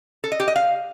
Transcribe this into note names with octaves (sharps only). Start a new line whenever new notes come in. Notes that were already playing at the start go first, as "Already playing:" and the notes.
A4
D#5
G4
D#5
F5